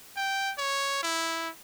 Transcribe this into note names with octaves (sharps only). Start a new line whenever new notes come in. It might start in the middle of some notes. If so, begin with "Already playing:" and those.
G5
C#5
E4